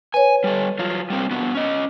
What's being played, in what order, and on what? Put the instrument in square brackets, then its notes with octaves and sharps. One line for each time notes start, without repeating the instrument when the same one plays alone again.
[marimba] B4 C#5 [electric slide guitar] G#5
[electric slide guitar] G3 A4
F#3 F4
G3 A#3 C4
B3 D4 F#4
C#4 D#5